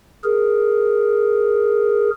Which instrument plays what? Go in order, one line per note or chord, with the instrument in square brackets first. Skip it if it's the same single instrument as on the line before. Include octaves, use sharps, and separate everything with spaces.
[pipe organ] G#4 A#4